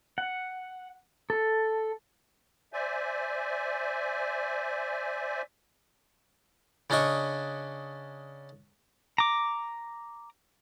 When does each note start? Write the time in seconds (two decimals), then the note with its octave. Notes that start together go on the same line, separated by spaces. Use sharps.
0.18 F#5
1.30 A4
2.73 C5 D5 E5 G#5
6.90 C#3 C#4 D4 D#5 C#6
9.18 A#5 D6